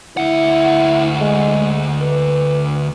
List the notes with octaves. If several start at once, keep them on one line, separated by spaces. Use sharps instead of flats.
D2 E4 F#5
G#3
B4